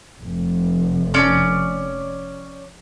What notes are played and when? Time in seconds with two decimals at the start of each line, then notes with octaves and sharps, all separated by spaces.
0.22 F1
1.14 C#4 D5